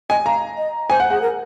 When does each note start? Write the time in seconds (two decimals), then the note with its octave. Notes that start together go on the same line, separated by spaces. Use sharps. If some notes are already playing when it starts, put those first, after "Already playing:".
0.10 D#5 G#5
0.26 F5 A#5
0.58 D#5
0.90 C5 G#5
1.00 F#5
1.10 G#4 F#5
1.22 A#4